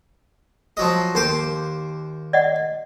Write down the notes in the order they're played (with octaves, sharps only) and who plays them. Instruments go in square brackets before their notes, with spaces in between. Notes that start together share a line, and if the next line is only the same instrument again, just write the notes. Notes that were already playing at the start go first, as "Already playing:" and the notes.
[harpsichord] F3 F#3 D#5
D#2 C5 D6
[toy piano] D5 D#5 F#5